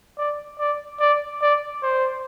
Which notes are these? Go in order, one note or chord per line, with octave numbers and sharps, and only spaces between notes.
D5
D5
D5
D5
C5